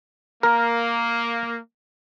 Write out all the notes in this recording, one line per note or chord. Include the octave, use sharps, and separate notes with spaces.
A#3 A#4